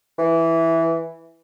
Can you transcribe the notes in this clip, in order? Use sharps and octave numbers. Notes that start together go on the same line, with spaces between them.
E3